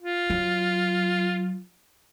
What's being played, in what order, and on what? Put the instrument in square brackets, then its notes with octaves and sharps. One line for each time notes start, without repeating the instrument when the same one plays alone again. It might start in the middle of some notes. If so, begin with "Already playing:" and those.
[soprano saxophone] F4
[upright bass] F#3